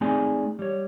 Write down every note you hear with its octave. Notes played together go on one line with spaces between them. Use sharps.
A3 C4 D#4 G#4 D5 G#5
G3 C#5